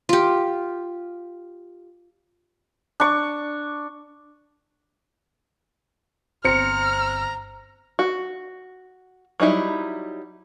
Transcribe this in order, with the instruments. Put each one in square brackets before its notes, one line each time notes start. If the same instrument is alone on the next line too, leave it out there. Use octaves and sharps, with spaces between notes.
[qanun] F4 G4
[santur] D4 C#6
[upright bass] G1 [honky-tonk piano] C4 C#7 [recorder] A#5 [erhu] F6
[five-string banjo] F#4
F#3 G3 D#4 E4